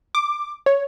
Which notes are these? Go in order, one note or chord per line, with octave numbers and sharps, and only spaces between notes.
D6
C#5